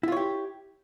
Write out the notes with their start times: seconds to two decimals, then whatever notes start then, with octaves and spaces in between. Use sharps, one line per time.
0.03 E4
0.08 F4
0.12 C#5
0.17 G4